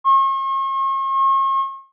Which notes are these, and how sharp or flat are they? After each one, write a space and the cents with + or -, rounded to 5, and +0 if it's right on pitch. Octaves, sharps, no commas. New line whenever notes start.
C#6 -45